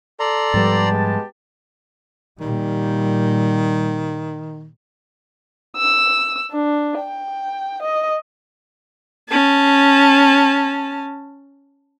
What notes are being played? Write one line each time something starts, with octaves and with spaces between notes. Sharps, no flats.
A4 D5 A#5 C6
G#2 F3 G3 B3 G4 A5
G#3
A#2 D#3 G3
E6
D4
G5
D#5
C#4 A5